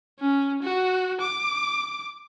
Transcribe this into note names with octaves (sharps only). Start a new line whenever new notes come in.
C#4
F#4
D6